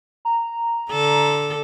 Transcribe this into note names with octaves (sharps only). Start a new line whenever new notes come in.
A#5
D3 A4